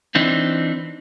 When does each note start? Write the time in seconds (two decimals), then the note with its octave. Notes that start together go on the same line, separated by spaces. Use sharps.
0.15 E3 C4 D4 D#4